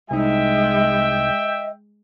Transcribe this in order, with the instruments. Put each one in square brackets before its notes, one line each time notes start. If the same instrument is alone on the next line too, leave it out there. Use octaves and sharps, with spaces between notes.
[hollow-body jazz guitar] C2 D#4 [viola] G#3 [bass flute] D#5 [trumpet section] E5 G5